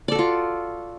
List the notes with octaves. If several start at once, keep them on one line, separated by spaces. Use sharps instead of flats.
F4 F#4 A4 D5